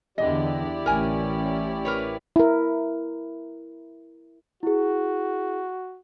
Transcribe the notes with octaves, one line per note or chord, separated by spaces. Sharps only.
E2 D3 E4 G4 D5 D#5
A1 C#4 A#4 G#5
A#4 B4 C#5
E4 A#4
E4 F#4 G#4